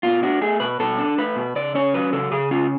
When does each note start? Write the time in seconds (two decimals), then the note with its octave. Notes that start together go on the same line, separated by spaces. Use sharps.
0.03 B2 F4
0.23 D4 F#4
0.41 A3 G#4
0.60 B2 B4
0.80 B2 A4
0.98 D4
1.18 A3 B4
1.36 B2
1.56 C#3 D5
1.75 C#4 C#5
1.94 F#3 B4
2.13 C#3 A4
2.32 C#3 G#4
2.51 C#4 F4